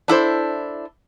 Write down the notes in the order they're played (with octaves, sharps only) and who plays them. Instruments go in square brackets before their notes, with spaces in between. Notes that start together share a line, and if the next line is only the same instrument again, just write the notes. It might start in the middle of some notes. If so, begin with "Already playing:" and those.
[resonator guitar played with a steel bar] D4 E4 A4 C5